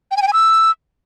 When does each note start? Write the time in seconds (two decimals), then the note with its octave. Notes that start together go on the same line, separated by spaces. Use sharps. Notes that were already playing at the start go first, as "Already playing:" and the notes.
0.11 G5
0.17 G#5
0.22 G5
0.28 G#5
0.33 E6